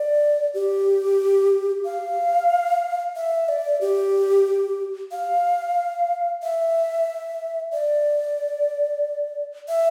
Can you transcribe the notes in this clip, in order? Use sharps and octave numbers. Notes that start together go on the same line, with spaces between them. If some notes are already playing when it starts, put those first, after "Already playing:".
Already playing: D5
G4
F5
E5
D5
G4
F5
E5
D5
E5